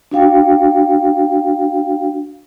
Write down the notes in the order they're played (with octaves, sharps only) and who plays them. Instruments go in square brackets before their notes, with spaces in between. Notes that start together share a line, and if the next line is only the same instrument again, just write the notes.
[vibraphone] D4 F#4 F5 G5